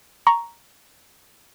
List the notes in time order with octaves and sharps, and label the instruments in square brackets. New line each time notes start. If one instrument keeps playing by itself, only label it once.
[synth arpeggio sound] A#5 C#6